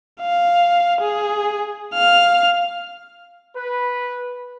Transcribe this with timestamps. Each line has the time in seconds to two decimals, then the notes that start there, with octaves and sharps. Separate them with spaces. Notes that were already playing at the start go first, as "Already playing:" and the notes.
0.21 F5
1.01 G#4
1.94 F5 F6
3.54 B4